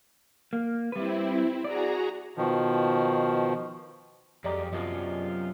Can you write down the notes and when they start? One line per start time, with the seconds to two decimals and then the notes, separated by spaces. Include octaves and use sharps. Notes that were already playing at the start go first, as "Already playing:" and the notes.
0.53 A#3
0.92 G3 C4 E4 B4
1.64 F#4 G#4 D5 A#5
2.37 B2 D#3 F3
4.44 F2 F#3 G#3 G4 D5 D#5 A#5
4.73 F#2 C3 B3 D4 F4 G#4 D#5